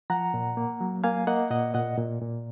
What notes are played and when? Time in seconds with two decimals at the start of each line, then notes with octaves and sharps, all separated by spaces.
0.10 F3 F#5 A#5
0.34 A#2
0.57 A#3
0.81 F#3
1.04 A#3 F5 G#5
1.27 A#3 D#5 F#5
1.51 A#2 D#5 F#5
1.74 A#2 D#5 F#5
1.98 A#2
2.22 A#2